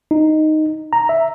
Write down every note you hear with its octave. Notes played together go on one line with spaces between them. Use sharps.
D#4
A#5
E5